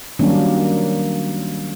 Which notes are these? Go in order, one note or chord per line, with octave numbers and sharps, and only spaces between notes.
D#3 F#3 G3 A#3 C#4 D4